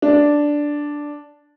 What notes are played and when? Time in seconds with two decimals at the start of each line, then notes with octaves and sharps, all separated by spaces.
0.02 D4